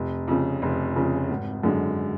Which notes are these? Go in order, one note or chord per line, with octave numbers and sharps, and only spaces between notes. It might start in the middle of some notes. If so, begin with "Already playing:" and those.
Already playing: F1
F2 C#3
F1
F2 C#3
G#1
F#2 D3 G#3